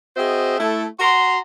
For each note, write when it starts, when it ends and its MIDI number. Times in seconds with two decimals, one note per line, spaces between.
0.17 0.57 60
0.17 0.57 66
0.17 0.57 68
0.17 0.57 72
0.17 0.57 75
0.17 0.57 76
0.60 0.87 57
0.60 0.87 64
0.60 0.87 69
1.00 1.40 66
1.00 1.40 82
1.00 1.40 84